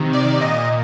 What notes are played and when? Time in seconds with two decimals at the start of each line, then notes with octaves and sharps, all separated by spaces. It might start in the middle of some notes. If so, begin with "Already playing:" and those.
Already playing: C3 D#3
0.13 D5
0.41 A#2 D#5